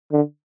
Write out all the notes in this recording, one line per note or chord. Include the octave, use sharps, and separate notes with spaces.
D3